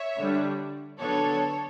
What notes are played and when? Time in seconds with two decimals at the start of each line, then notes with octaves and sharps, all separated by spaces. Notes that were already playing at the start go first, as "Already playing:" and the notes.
Already playing: C#5 E5
0.19 D3 G3 D4
1.00 D3 F#3 B3 D4 A4 C#5